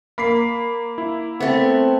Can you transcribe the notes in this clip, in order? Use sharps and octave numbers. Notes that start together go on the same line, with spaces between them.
A#3 B5 B6 C7
E4
A3 B3 C4